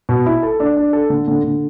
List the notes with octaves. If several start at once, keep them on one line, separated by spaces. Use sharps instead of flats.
B2
E4
A4
D4
D4
A4
D3
D3
D3